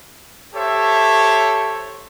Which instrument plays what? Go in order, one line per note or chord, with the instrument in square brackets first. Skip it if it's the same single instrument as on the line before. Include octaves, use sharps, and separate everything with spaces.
[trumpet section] G4 A4 C5 C#5 E5